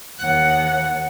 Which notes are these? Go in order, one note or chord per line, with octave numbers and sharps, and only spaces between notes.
D#2 F#5